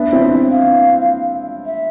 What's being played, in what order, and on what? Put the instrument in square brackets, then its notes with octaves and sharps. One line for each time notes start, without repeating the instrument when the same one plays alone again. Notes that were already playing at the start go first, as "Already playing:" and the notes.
Already playing: [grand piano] B3 D4 [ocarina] E5
[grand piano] C4 E4
[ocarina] F5
E5